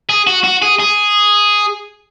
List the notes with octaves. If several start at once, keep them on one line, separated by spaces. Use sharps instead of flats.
G#4
F#4
F#4
G#4
G#4